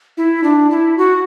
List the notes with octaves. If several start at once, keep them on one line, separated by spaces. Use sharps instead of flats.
E4
D4
E4
F#4